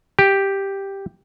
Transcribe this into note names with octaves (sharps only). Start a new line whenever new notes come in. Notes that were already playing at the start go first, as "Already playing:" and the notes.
G4